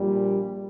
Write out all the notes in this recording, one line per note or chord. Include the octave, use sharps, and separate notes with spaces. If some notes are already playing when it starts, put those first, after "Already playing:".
Already playing: A#1 A#2 G3